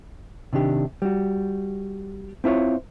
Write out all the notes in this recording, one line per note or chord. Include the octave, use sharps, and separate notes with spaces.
C3 D#3 D4 G4
G3 F#4
C4 E4 F4 A#4 C#5